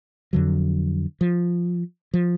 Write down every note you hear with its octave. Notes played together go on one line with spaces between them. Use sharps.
F2 D3 F#3
F3
F3